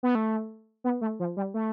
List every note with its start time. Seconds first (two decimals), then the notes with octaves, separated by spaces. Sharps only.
0.03 B3
0.15 A3
0.84 B3
1.01 A3
1.20 F3
1.37 G3
1.54 A3